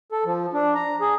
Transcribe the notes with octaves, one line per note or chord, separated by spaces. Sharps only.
A4
F3
D4
A#5
G#4